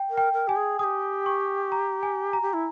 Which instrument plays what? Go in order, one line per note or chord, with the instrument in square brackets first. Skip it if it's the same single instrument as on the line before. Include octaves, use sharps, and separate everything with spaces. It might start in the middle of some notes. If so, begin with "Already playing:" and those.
Already playing: [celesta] G5
[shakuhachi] A#4
[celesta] G5
[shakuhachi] A#4
[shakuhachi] G4 [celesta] G#5
[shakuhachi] G#4
[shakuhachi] G#4 [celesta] D#6
[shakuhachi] G4
[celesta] C#6
A#5
G#5
A#5
[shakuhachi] G4
E4